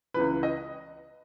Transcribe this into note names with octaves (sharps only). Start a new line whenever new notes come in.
C#2 C#3 E3 B4
D#5